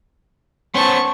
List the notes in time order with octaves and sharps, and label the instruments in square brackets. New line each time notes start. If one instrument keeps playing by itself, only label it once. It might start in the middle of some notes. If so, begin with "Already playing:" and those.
[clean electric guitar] B3 C#4 C5 [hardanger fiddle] A5 C#6